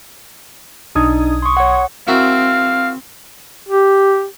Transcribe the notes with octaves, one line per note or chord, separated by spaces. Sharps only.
B1 D4 D#4 D#6 G#6
C6 C#6
C#5 F#5
C4 E4 F#4 A#4 F5
G4